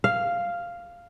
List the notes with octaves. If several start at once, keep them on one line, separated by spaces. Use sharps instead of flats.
F5